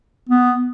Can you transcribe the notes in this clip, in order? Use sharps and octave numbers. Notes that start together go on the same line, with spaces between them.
B3